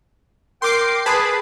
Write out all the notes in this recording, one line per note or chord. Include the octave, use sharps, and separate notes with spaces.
A#4 G5 C6 D6 C7
G#4 B4 A5 B5